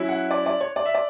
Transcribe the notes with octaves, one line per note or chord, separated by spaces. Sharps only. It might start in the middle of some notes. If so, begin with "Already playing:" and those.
Already playing: F#3 C#4 E4
F#5
D5
D5
C#5
D5
E5
D5